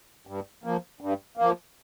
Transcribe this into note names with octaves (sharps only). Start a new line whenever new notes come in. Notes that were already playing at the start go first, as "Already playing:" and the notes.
G2
F3 A#3
G2
F3 A#3